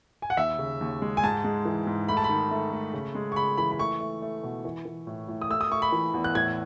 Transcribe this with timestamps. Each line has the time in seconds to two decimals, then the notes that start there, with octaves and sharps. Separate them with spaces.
0.22 G#5
0.30 F#5
0.37 D#2 E5
0.59 C#3
0.81 D#2
1.02 G#3
1.17 G#5
1.23 G#2 A5
1.44 G#3
1.65 E3
1.87 G#2
2.08 A3 B5
2.17 A5
2.24 B5
2.29 D#3
2.51 A3
2.72 A3
2.93 C#3
3.15 G#3
3.32 C#6
3.36 C#3 B5
3.57 E3 B5
3.71 B5
3.79 A3 C#6
4.00 A3
4.22 A3
4.44 B2
4.65 E3
4.85 E3
5.07 A2
5.28 A2
5.42 D#6
5.50 A3 E6
5.61 D#6
5.71 A3 C#6
5.82 B5
5.92 E3
6.14 E2
6.24 F#6
6.35 A2 G#6